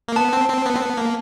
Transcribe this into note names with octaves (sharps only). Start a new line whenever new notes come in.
A#3
B3 A5
C4
C4
B3
C4
B3
A#3